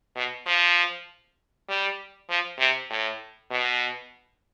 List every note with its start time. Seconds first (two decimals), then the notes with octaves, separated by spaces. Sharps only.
0.16 B2
0.46 F3
1.69 G3
2.29 F3
2.59 C3
2.90 A2
3.51 B2